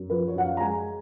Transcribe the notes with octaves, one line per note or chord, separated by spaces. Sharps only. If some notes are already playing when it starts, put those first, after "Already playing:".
Already playing: F#2
F3 B4
C#5
F#2 F#5
F5
A#5
G#3 G#5